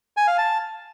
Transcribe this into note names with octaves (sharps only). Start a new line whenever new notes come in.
G#5
F5
A5